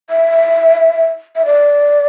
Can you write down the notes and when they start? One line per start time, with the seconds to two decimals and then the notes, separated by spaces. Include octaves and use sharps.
0.10 E5
1.36 E5
1.45 D5